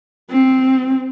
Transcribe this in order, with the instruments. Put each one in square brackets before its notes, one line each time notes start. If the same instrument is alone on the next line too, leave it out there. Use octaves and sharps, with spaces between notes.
[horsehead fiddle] C4